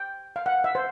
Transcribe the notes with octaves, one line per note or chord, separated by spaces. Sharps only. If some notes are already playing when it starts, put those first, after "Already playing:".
Already playing: G5
F5
F#5
E5
C5